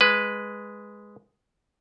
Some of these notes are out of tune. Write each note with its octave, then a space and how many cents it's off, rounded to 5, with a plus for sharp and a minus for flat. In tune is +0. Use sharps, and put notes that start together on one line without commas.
G#3 +0 B4 +0